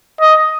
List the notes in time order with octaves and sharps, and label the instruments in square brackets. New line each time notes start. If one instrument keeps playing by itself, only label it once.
[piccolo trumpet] D#5